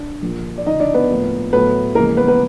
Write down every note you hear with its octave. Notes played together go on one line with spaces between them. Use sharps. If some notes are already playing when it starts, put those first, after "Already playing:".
Already playing: D4
A#1 A#2 F3
D5
D2 C#3 F3 D#4 D#5
D4 D5
B3 B4
A2 F3 A#3
A2 F#3 A3 B3 B4
F2 C#3 E3 G#3 A#3 A#4
B3 B4
B3 B4